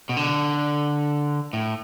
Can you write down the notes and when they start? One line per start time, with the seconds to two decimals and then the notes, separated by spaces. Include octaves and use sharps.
0.09 B2
0.17 D3
1.53 A2